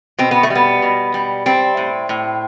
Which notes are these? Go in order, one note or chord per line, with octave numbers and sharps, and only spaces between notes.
B2 C4
B3
A3
G3
B3
B2
G3
G3 C4
A2
A2